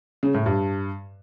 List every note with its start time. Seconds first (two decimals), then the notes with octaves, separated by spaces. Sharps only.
0.23 C#3
0.34 A2
0.46 G2